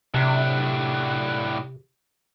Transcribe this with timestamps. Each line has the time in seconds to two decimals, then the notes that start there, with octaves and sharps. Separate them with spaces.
0.14 A2 C3 D4